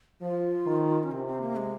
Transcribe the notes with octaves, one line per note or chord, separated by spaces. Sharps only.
F3 F4
D#3
C#4
C3 C4
C4
A#3
G#3